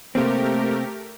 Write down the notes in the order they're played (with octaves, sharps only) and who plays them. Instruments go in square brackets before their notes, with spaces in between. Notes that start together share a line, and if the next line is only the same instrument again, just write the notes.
[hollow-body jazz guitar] C3 A#3 C4 [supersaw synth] A3 G4 A#4